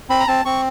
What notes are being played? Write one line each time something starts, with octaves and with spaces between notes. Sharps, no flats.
C4 B5
A#5
C4 A5
C4 C#6